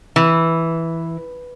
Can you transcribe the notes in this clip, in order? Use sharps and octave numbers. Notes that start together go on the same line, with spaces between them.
E3